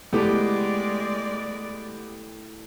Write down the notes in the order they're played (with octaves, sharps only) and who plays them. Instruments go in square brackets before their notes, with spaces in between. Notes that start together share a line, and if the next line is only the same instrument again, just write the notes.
[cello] G#3 D5 [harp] A3 E4 [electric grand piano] B3 G4